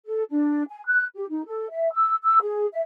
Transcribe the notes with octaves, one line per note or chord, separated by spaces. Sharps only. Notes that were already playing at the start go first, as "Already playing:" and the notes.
A4
D4
G#5
F#6
G4
D#4
A4
E5
E6
E6
G#4
E5